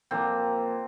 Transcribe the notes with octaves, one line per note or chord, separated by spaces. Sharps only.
A#2 F3 A#3 C4